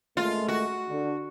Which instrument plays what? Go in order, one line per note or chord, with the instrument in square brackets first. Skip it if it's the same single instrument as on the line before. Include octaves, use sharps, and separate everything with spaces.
[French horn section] A#2 G#3 A3 [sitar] F4
[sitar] F#4
[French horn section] D3